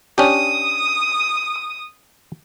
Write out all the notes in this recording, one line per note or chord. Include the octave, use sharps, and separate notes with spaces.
C#4 D4 G4 D#6